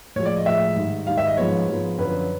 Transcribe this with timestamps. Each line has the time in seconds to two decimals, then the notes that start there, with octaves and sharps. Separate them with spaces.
0.16 A2 F3 G#3 C#5
0.26 D5
0.36 D#5
0.46 A2 F3 G#3 E5
0.76 G#2 D#3 G3
1.07 G#2 D#3 G3 F5
1.17 E5
1.27 D#5
1.37 G#2 F3 G#3 B3 C#5
1.68 G#2 F3 G#3 B3
1.98 F#2 D3 F3 B4